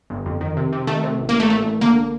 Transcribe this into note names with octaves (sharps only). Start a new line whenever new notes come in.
G1
F2
D#3
C3
C3
D#3 A3
C3
A1
A#3
A1
A3
A1 A3
A1
D3 A#3